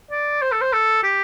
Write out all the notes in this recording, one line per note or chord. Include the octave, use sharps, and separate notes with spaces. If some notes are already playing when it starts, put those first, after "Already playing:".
D5
C5
A4
C5
A4
G4